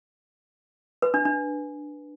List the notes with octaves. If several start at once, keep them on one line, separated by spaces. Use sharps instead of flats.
B4
D4
D4